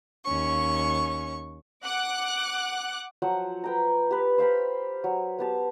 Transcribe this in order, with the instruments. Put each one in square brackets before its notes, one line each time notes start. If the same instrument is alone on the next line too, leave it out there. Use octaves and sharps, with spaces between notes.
[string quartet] D#2 C#4 C#6
[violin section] F#5 D6 F#6
[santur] F3 F#3 C5 F#5
B4 G5 A#5
G4 B4
C5 F5 G5 B5
F#3
B3 G4 A5